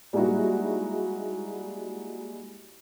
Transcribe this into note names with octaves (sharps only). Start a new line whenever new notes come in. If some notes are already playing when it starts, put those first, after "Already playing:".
G3 G#3 A#3 D#4 E4 F#4